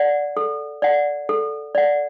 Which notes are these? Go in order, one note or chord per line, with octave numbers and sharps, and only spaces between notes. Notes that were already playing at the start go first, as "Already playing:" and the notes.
Already playing: D5 F#5
A4
D5 F#5
A4
D5 F#5